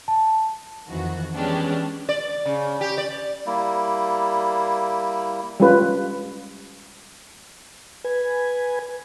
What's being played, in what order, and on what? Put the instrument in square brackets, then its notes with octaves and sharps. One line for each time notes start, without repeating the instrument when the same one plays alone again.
[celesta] A5
[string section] F2 D#3 E3 F#4
E3 G#3 B3 C#4 D4 G4
[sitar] D5
C#3
G4
D5
[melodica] G3 A#3 E4
[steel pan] G3 G#3 C#4 F4 B4
[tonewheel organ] B4 G#5